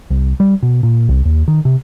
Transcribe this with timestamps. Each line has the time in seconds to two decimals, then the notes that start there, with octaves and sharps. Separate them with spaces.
0.10 C2
0.40 G3
0.63 B2
0.83 A#2
1.09 C2
1.25 D#2
1.48 D#3
1.65 C3